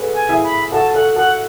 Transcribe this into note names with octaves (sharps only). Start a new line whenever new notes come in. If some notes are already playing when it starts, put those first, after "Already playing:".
Already playing: F#4 G#4 A4 B4
G#5
E4 G#4
B5
F#4 A4 A5
F#4 A4 F#5
F#4 A4 F#5